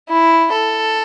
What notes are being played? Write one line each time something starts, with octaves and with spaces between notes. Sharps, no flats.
E4
A4